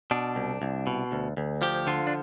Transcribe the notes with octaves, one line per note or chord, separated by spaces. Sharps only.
B2 D4
C2
C2
B2
D2
D2
F3 G4
D3 F4
D4